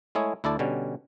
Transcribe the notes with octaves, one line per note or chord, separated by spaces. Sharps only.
G#3 A3 E4 G#4 C#5
D2 E4 A4 D5 A5
B2 D3 G3 C#4